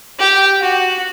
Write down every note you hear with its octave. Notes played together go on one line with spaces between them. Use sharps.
G4
F#4